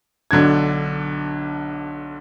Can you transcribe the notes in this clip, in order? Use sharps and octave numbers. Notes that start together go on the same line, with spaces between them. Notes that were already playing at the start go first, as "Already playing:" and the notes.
B1 D3 D4 G#6